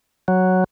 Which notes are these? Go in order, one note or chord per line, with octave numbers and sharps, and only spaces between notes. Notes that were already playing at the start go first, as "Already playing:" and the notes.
F#3